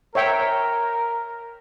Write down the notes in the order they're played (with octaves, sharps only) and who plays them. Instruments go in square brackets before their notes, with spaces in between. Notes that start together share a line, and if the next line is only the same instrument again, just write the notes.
[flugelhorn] A#4 [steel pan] C#5 E5 G5